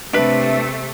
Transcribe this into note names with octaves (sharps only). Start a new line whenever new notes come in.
C3 A3 D4 B4 E5